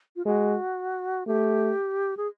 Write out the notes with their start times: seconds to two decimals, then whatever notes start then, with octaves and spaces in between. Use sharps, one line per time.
0.16 F4
0.26 G#3 F#4
1.27 A3 G4
2.17 G#4